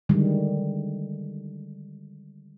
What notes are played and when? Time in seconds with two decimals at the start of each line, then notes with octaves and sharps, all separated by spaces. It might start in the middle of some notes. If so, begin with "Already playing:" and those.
0.09 D3 D#3 G3 G#3